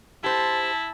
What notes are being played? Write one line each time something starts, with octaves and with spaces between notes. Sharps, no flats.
E4 G4 C5 A5